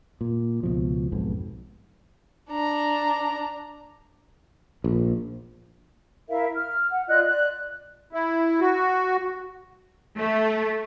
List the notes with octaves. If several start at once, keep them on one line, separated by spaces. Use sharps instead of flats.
A#2
C#2 B2 F3
B1 F2 G#2 B2
D4 A#5
A#1
E4 A#4 E5 F5
F6
F#5
F4 D5 D#5 F#6
D5 F#6
E4
F#4
A3